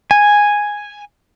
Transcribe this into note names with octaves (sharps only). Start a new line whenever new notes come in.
G#5